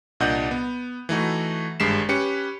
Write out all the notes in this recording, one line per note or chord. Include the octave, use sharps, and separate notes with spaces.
C2 A#2 D4 D#5 F#5 G6
B3
E3 A3 D#4 F#4
G#1 G2 G#3 B6 C7 E7
C#4 G4 B4 C#7